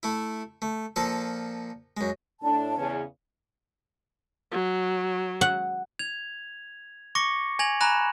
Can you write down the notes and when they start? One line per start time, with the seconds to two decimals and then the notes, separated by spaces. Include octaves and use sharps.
0.03 A3 E4
0.62 A3
0.96 A#2 F3 A4 A5
1.97 F#2 G#3
2.42 A2 D4 A5
2.77 E2 C#3 C#4
4.52 F#3
5.41 F#5
5.99 G#6 F7
7.15 C#6 D6 A#6 C#7
7.59 G#5 G#6 A#6 F7 F#7
7.81 G#5 A#5 B5 F#6 A#6 E7